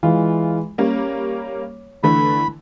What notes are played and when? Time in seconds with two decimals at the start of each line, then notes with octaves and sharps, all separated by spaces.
0.03 E3 G#3 F4
0.78 G3 A#3 C#4 C#5
2.03 D3 E3 A3 B5